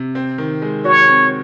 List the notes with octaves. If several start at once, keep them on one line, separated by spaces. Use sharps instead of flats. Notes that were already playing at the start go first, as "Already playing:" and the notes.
Already playing: C3
C4
D#3
G#3
F#4 C#5
C4